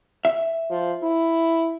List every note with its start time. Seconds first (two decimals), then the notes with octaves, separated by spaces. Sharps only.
0.25 E5
0.70 F3
1.03 E4